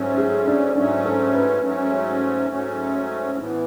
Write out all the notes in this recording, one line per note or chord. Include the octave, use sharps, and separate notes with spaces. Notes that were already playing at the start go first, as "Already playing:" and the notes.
Already playing: G#2 F#3 A3 C#4
G#4
D4
G#2 F#3 A3 C#4 D4
A4
B4
G#2 F#3 A3 C#4
G#2 F#3 A3 C#4
A2 E3 B3